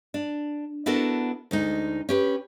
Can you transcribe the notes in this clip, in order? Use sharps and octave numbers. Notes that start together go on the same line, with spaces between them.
D4
B3 D4 E4 F#4 A4 A#4
D2 G#3 D#4
C#4 G4 B4